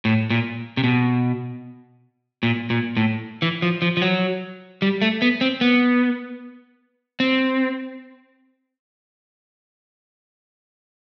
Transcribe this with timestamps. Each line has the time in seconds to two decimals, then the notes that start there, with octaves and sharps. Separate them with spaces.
0.05 A2
0.30 A#2
0.77 C3
0.84 B2
2.43 A#2
2.70 A#2
2.97 A2
3.42 E3
3.62 F3
3.82 F3
3.97 F3
4.02 F#3
4.82 G3
5.02 A3
5.22 B3
5.41 C4
5.61 B3
7.20 C4